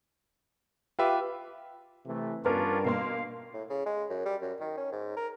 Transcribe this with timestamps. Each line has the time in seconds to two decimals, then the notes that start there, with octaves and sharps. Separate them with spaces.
0.99 F4 G4 B4 E5
2.06 C3 E3 A3
2.45 G2 B3 C#4 D4 F4 A#4
2.85 B2 A#3 F5 C6
3.54 A2
3.70 C#3
3.86 G#3
4.10 F#2
4.25 G3
4.41 F#2
4.60 D#3
4.77 C#4
4.92 G#2
5.17 A#4